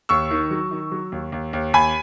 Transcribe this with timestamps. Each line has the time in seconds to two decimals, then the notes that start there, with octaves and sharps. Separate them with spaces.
0.09 D#2 C#6 E6
0.31 D#3
0.51 F#3
0.71 D#3
0.92 F#3
1.12 D#2
1.32 D#2
1.53 D#2
1.73 D#2 G#5 B5